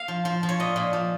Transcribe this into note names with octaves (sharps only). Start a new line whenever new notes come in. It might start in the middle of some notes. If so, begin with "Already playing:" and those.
Already playing: F5
F3
F3
F3
C#5
A#2 D#5
A#2
F3